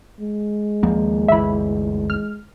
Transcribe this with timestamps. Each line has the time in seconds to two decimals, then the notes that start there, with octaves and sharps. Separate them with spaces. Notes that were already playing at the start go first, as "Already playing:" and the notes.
0.21 G#3
0.83 D#2 F3 A#3
1.28 G1 D2 E3 E5 B5
2.10 F6